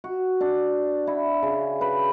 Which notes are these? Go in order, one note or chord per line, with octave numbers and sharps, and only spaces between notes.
F#4
D4
E4
C#3
B4